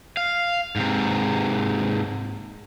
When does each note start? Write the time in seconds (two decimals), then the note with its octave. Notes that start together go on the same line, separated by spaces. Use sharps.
0.17 F5
0.76 G#2 C3